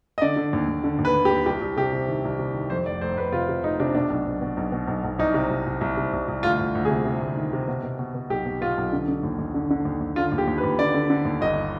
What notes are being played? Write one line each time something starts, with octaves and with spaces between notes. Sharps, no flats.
D#5
D3 D5
D3
D#2
D#2
D3
D#2
B4
D#2
G4
D#2
C2 G4
C2
C3 G4
C3
D#3
C2
C3
D#3
F2 C5
F1 D5
F1 C5
F1 B4
C3 F4
C3
F1 D#4
C3 D4
B2 D4
B1
B1
B2
B1
B2
B1
B1
C2 D#4
C3
C2
C2
C2
C3
C2
C2
D2 F4
D2
D2
G#4
C3
C3
D2
D#3
C3
B2
B2
B2
B2
B1 G4
B2
B2 F4
B1
D3
D3
D#2
D#2
D3
D3
D#2
D#2
D3 F4
D#2
G4
D#2
B4
D#2
D3 D5
D3
D3
D#2
G1 D#5